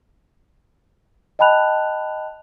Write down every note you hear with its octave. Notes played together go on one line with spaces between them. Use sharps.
D#5 G5 A5 B5 F#6 F7